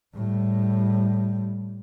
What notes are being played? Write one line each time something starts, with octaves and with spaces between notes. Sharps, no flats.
A2 G3